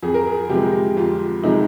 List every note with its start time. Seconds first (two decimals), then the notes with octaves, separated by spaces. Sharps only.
0.02 F2 G#4
0.14 A#4
0.27 G#4
0.49 C3 F3 G#3 G4
0.96 F2 F4
1.43 C3 F3 G#3 D#4